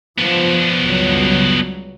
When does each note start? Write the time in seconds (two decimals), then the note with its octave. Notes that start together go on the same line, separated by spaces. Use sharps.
0.19 F3 B3 D4
0.82 C#2 F#3 G3